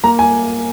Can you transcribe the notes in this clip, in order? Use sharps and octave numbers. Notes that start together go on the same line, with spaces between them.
A#3 A#5
G#5